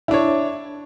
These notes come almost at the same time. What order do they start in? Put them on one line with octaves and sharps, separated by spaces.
E4 D4 C#5